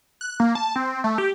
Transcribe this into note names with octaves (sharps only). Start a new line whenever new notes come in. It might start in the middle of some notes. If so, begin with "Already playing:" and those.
F#6
A#3
A5
C4
A3
G4